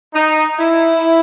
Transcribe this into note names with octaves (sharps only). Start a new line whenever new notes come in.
D#4
E4